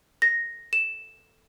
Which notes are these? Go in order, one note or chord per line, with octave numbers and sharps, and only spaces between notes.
A#6
E7